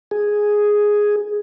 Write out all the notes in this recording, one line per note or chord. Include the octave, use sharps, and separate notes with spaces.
G#4